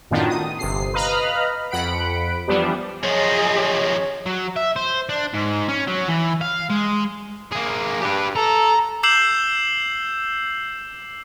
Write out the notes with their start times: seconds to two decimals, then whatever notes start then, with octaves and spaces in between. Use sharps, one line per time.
0.11 F#2 A2 D#3 B3 D4 F4
0.29 D#6
0.59 G1 C3 C7
0.94 B4 D#5 F5 A#5 B5 F6
1.71 F2 F#5 B5 D7
2.48 E3 F3 G3 B3 D4 G4
3.03 F#2 F3 G#4 C#5 D#5
3.56 C#5
4.26 F#3
4.56 E5
4.76 C5
5.09 D4
5.34 G#2
5.69 C#4
5.87 F#3
6.08 E3
6.41 F5
6.70 G#3
7.52 A#3 G#4
8.01 G2 G4 B4
8.36 A4 A#5
9.03 D6 E6 G6 C7 E7 F#7